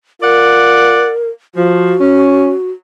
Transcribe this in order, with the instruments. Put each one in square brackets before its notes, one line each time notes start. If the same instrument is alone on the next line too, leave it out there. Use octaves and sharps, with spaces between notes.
[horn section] F4 D5 F#5 [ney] A#4
[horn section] F3 [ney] F#4
[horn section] C#4